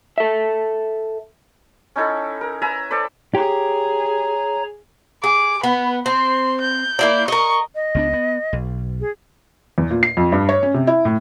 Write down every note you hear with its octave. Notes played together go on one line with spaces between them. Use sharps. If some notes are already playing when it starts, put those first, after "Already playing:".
A4 E5
C#4 D#4 E4 A4
A#4
B4 E5 G#5 A#5
A4 C5 D5 B5
G4 G#4 C#5 A#5
G#4 D6
B3 B4
C4 C6
G6
A#3 E4 D5
A#4 D#5 C#6
D#5
C#2 B3 D4
B3
B1
G#4
E2
A#2
C7
F2
G2
C#5
C#4
C3
E4
A2